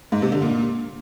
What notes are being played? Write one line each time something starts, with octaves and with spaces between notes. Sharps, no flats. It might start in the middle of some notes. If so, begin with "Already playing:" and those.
G#2
C3
D3
A#2